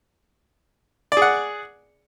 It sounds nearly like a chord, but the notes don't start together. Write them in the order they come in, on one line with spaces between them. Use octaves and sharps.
D5 G#4 F#5